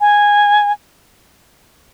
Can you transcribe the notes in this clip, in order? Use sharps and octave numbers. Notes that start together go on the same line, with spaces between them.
G#5